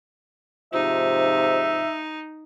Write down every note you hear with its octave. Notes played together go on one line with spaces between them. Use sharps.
G#2 C3 F3 D#4 E5